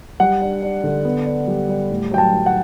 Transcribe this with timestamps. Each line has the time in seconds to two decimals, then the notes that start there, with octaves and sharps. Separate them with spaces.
0.20 G3 F#5
0.41 D4
0.62 D4
0.84 D3
1.05 B3
1.26 D4
1.47 G3
1.69 G3
1.90 A2
2.11 F#3 G5
2.18 A5
2.33 F#3
2.46 F#5